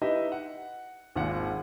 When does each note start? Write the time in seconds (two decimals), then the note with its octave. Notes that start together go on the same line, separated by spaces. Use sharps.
0.02 D#4 E4 G4 B4 D#5 E5
0.32 F#5
1.16 G#1 D#2 C4 F4 G#4 F#5